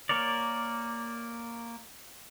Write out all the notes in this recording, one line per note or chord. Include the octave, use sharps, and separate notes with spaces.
A#3 A#4 C#5 D5